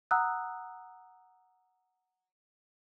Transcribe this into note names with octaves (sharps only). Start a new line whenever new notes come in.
F#5 A#5 D#6 E6 F#6